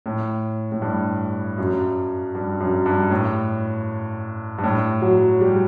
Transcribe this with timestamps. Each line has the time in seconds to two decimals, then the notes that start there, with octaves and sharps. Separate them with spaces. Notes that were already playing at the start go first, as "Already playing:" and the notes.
0.06 A2
0.72 A2
0.82 G2
1.58 F#2
2.35 G2
2.60 F#2
2.86 G2
3.10 A2
4.58 G2
4.64 A2
5.02 F#3
5.41 G3